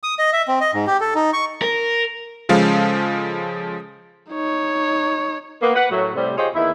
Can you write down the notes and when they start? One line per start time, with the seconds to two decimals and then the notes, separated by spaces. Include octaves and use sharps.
0.03 D#6
0.19 D#5
0.33 E5
0.48 C4
0.61 D#5
0.74 G#2
0.87 G4
1.01 A4
1.15 D#4
1.33 C#6
1.62 A#4
2.49 C#3 F3 G#3 A4 F5
4.30 D#4 C#5
5.61 A#3 B3
5.75 B4 F#5
5.90 A2 F#3
6.15 A2 C3 G3
6.37 F4 G4 G#4 C5 C#5 D#5
6.55 E2 D#3 A#3 E4